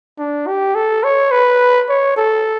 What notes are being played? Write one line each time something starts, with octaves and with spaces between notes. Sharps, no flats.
D4
G4
A4
C#5
B4
C#5
A4